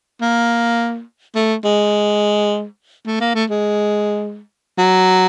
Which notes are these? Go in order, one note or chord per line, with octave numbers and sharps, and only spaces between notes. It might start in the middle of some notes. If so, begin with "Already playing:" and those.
A#3
A3
G#3
A3
A#3
A3
G#3
F#3